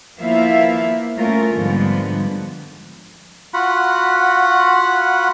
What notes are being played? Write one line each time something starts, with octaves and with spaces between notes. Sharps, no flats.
F3 A#3 B3 E4 E5 F5
A3 A#3 C#4 F4 A#4
G#2 D3 F3 G3 B3
F4 F#4 F#5 B5